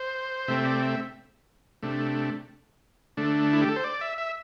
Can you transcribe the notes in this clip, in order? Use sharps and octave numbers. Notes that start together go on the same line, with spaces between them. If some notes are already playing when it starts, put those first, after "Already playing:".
Already playing: C5
C3 A3 C4 E5
D5
E5
C3 A3 D4
D3 A3 D4
E4
G4
A4
C5
D5
E5
E5